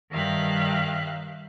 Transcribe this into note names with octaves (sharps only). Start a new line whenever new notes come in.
G2 D#3 E5 F5 G5 F#6